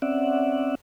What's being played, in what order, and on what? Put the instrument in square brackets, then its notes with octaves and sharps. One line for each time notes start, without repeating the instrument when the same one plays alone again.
[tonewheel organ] C4 C#4 D5 E5 F#5